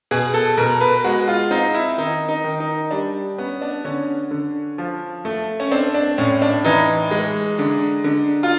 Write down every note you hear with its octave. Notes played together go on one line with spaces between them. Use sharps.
B2 G#4
A4
B2 A#4
B4
G#3 F#4
F4
C4 D#4
E4
D#3 D#4
D#4
D#3
D#4
G3 D4
B3 C#4
D4
D3 C#4
D3
F3
A3
C#4
C4 D4
D4
A2 C#4
D4
E3 D#4
G#3
D3
D3
F4